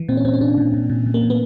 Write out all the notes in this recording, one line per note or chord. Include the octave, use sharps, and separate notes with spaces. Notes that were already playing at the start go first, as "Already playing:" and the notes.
Already playing: E3
A#2 C4
C#4
A#2 C4
C#4
A#2 D4
A#2
A#2
A#2
A#2
A#3
A#2
B3